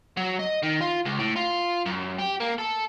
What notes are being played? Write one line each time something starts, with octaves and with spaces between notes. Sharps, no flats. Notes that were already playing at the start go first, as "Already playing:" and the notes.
F#3
D#5
D#3
F4
C#2
A2
F4
F#2
G4
A#3
A4